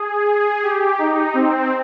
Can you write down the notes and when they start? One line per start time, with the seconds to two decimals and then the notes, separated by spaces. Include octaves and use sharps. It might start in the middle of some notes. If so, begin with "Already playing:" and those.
Already playing: G#4
0.63 G4
0.98 D#4
1.34 C4